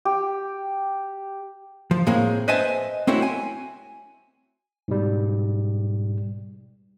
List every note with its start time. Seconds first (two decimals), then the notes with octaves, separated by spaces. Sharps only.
0.05 G4
1.91 F3
2.07 A2 G#3 A#3 C4 G#4
2.48 B4 C5 D#5 E5 G#5 A5
3.07 A3 C4 C#4 E4 F#4
3.22 G#5
4.88 G#2 B2 G3